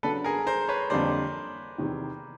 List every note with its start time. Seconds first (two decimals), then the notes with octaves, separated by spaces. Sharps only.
0.03 C#3 F#3 B3 D4 A4 B4
0.24 G#4 A#4
0.47 A#4 C5
0.69 B4 C#5
0.90 F2 D3 G3 A#3 C5 D5
1.78 E2 C3 D#3